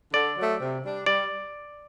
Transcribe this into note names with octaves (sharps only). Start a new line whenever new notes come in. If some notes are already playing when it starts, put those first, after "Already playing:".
D3 D5
F#3 A3
C3
G3 D4
G3 D5